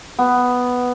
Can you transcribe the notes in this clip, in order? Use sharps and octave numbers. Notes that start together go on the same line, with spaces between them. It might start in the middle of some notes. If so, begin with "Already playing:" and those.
B3